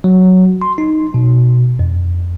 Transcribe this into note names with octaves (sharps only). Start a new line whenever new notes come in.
F#3
C6
D#4
B2
F2